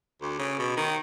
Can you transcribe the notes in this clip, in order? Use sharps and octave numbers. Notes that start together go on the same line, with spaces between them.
D2
C#3
B2
D#3